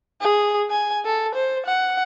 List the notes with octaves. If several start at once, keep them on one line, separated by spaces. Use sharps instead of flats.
G#4
G#5
A4
C5
F#5